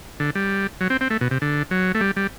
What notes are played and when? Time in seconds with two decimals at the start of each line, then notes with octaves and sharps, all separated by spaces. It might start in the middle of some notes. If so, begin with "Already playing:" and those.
0.20 D3
0.35 G3
0.81 F#3
0.90 C4
1.01 C4
1.10 A3
1.21 B2
1.31 C3
1.42 D3
1.71 F#3
1.95 A3
2.01 G3
2.17 G3